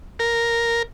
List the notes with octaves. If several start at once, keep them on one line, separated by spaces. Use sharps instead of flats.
A#4